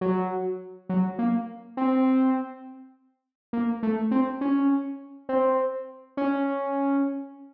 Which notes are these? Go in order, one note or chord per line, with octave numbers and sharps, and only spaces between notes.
F#3
F#3
A#3
C4
A#3
A3
C4
C#4
C4
C#4